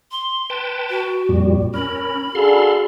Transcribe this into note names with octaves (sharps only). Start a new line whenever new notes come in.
C6
B4 G5 A5
F#4
F2 A#2 G3
C#4 A#4 B5
D4 F#4 G#4 A4 F5 C6